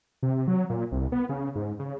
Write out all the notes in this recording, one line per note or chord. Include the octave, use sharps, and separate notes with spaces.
C3
F#3
A#2
C2
B3
C#3
G#2
C#3